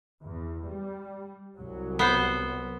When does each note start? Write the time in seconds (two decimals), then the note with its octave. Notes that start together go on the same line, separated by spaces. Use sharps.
0.23 E2
0.67 G3
1.58 C2 F#3
1.99 B3 C5